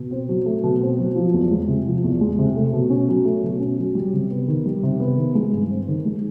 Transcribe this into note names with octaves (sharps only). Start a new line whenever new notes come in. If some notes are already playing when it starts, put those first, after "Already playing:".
Already playing: B2
C4
F#3
A3
B2
C4
F#3
F3
E2
G#3
C3
F3
E2
G#3
C3
A3
B2
C#4
F#3
A3
B2
C#4
F#3
G3
C3
B3
D#3
G3
C3
B3
D#3
G#3
G2
C4
D#3
G#3